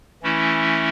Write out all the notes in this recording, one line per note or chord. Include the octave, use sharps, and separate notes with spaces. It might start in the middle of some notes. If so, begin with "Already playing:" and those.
E3 A3 C#4 E4